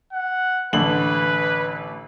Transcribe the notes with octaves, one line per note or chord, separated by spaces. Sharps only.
F#5
A1 D3 B4 F#7